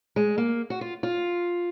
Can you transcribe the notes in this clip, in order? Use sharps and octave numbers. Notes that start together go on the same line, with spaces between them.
G#3
A#3
F#4
F4
F4